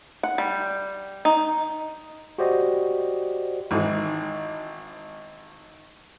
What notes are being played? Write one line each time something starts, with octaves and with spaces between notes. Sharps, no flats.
F#5
G3
D#4
F#4 G4 C5 D5 D#5
G#1 G#2 E3